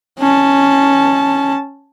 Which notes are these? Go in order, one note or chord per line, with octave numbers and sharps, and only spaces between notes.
C#4 A5